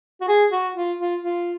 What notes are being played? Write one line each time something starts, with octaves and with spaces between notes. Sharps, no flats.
F#4
G#4
F#4
F4
F4
F4